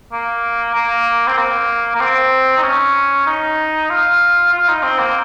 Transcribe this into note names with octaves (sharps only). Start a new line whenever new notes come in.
A#3
A#3
C4
A#3
A#3
C4
D#4
C#4
D#4
F4
F4
D#4
C4
A#3